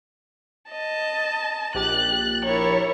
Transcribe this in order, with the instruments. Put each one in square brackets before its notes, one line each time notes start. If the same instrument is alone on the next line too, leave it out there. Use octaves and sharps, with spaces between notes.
[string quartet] D#5 A5
[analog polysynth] A#1 G4 A6 [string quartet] F#6
[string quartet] E4 A#4 C#5